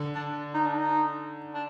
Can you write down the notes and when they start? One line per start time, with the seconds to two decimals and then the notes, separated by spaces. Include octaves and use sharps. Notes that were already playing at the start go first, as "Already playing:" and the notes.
Already playing: D3
0.15 D4
0.54 D#4
0.66 D4
0.78 D#4
1.54 D4